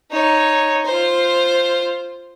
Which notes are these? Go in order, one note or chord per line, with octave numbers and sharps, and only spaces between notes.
D#4 C#5
F4 C5